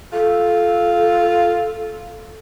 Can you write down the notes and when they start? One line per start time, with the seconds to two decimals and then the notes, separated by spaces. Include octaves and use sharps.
0.13 F4 A4